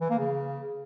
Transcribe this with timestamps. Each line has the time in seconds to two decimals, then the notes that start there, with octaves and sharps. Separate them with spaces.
0.01 E3
0.10 A#3
0.19 C#3